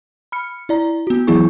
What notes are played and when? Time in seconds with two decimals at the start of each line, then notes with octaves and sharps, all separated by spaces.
0.32 B5 F6 C#7
0.69 E4 D5 A#5
1.07 B3 F#4
1.27 E3 F#3 B3 E4 G#4 C#6